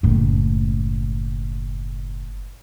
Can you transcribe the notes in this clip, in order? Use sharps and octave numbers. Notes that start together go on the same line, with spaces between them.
F#1 A2